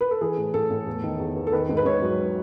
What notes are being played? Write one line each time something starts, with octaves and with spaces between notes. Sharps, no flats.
B4
A4
E3 G#4
A2
A2 A4
A2
E2
D#3
E2
E2
A4
D#3 B4
G#2
B4
G#2 C#5
F#3